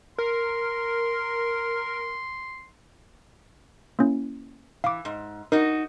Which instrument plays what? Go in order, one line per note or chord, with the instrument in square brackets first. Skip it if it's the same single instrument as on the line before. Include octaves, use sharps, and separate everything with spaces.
[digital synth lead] A#4 [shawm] C6
[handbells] A#3 C#4 E4
[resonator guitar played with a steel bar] E3 [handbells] F5 D6
[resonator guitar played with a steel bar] G#2
[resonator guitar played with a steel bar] D#4 F#4 [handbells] A#4